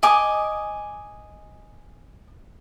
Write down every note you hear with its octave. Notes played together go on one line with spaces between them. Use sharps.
D#5 G#5 D6